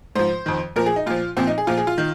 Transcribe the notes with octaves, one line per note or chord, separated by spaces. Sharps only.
G#2 F3 C5
F2 D#3
A#2 F3 A#4
G#4
D#4
A#2 F3 F4
A#2 F3 C4
D#4
G#4
A#2 F3 F4
G#4
F4
D#3